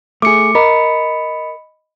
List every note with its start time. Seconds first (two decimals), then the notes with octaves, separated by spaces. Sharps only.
0.22 A3 G#4 D6 C#7
0.55 A#4 D#5 B5 C#7